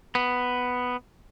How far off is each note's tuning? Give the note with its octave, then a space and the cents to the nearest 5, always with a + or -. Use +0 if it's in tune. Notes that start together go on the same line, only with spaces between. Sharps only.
B3 +5